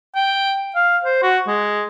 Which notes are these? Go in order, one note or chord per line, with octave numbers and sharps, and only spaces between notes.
G5
F5
C5
F#4
G#3